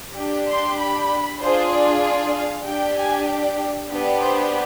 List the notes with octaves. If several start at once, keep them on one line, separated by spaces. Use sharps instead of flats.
D4 G4
C6
B5
D4 F4 G#4 C5
D5
D5
F5
D4 G4 G5
G#5
D5
B3 D4 G4
C5